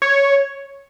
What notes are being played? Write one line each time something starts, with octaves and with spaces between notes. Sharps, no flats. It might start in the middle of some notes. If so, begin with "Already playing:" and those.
C#5